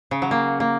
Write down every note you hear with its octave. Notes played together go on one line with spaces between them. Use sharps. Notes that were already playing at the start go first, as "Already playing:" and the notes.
C#3
F#3
A#3
A#3